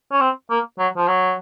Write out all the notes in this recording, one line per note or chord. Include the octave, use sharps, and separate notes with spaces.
C#4
C4
A#3
F#3
F3
F#3